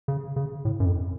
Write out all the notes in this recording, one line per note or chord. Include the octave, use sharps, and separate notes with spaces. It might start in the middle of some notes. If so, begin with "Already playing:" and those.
C#3
C#3
A2
F#2
F2